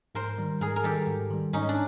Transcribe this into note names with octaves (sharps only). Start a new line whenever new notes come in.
G#2 A#4 C5
D#3 G3
G#2 G#4 A#4
A#4
D#3 G3 G4 A4
G#2
D#3 G3
G#2 C#4 D#4
D4